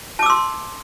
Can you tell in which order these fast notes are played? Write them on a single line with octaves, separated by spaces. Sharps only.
A5 D6 E6 C6